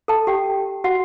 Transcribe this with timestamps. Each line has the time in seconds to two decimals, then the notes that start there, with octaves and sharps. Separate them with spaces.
0.08 A4 A5
0.27 G4 G5
0.84 F#4 F#5